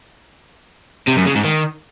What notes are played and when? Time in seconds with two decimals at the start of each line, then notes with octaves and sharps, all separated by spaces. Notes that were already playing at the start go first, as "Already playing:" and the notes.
1.07 C3
1.16 F#2
1.26 C#3
1.35 G#2
1.44 D#3